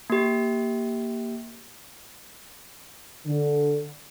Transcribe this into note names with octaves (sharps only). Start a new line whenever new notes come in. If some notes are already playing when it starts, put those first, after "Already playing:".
A#3 G4
D3